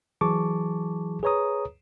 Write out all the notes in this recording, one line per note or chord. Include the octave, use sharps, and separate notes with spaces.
E3 F#3 G#4 A5 C#6 D6
G#4 B4 C#5 A#5 D#6